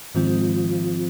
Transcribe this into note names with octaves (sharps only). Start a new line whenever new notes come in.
G#2 D#3 F3 G#3 C4